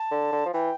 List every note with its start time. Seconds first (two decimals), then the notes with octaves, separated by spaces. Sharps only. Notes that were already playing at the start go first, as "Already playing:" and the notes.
Already playing: A5
0.11 D3
0.32 D3
0.45 F3
0.54 E3 G5